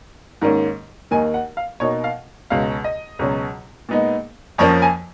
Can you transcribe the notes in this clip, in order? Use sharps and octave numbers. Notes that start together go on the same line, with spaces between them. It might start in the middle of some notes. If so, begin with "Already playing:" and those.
G#2 D#3 A#3 C#4
D#2 D#3 A#3 D#4 G#5
F#5
F5
B2 A#3 D#4 C#5
F5
C#2 B2 G#3 C#4 F5
D#5
C#2 B2 F#3 C#4
A#2 G#3 B3 D#4
F2 F3 A#3 C#4 C#5
G#5